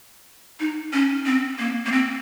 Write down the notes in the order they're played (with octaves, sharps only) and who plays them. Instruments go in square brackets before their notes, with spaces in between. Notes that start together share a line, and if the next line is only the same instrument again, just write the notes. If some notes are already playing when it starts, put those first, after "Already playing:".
[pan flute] D#4
C#4
C4
A#3
A#3
C4